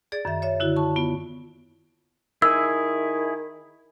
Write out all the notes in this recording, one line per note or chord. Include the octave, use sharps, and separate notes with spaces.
G#4 D5 A6
F#2 D#3 E5
C#5 E5
D3 E4 F#4
A5 C#6
B3 F4
D#3 E4 G#4 E6